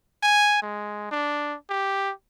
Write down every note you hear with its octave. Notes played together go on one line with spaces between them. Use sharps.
G#5
G#3
D4
G4